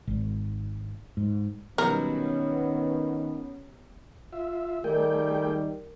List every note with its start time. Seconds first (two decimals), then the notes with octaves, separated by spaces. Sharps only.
0.07 G#1
1.17 G#2
1.78 B2 D#3 F#3 G3 B3 C#4 A#4
4.33 F4 E5
4.84 D#3 G3 A3 G#4 A#4 G5